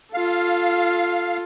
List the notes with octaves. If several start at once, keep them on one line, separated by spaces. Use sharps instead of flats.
F4 A4 F5